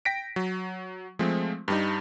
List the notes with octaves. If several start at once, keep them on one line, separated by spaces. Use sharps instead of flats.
G5 A#6 B6 D7
F#3
F3 G#3 A3 C4
G2 G3 D#4